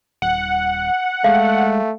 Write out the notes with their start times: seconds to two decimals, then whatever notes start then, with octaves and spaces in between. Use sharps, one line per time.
0.22 D#1 F#5
1.24 G#3 A3 F5